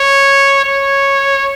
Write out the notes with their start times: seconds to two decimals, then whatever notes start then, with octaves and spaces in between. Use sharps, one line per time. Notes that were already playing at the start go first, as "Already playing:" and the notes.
Already playing: C#5
0.65 C#5